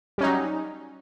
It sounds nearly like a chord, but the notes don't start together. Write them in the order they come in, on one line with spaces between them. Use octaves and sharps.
G3 C#4 D#4 F#3